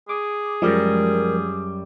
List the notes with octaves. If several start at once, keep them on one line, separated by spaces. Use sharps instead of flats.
G#4 D6
F#2 F3 G3 G#3 A#4